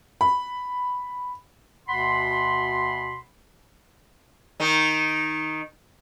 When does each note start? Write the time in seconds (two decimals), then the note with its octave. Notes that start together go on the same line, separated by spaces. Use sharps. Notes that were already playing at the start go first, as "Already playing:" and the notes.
0.21 B5
1.88 D2 B2 F#5 B5 C6
4.60 D#3 D#4